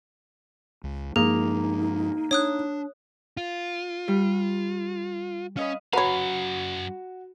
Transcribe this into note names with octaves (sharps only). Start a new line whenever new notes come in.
C#2
G2 F3 G#3 A#3 D#4 G#4
D4 C#5 D#6 F#6
F4
G3
C#4 B4 D#5 F5
F#2 F#4 B4 C#5 F5 A#5 B5